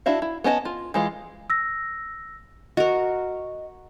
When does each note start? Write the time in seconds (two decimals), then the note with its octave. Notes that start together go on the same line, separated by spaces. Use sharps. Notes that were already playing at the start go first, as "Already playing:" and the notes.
0.06 D4 E4 F#4 E5 F5
0.22 E4
0.44 B3 C#4 D#5 G#5 A5
0.65 F4
0.94 E3 G#3 F4
1.50 E6 A#6
2.77 F#4 A#4 D#5